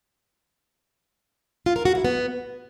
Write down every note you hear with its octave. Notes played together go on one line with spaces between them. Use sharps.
F4
A#4
F#4
E4
B3